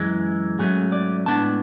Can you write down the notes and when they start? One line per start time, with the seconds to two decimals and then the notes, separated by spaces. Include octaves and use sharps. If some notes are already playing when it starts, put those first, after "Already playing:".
Already playing: F#2 E3 G#3
0.59 G#2 F#3 A3 C#4 G#4
0.92 D5
1.26 A2 G#3 B3 D4 A5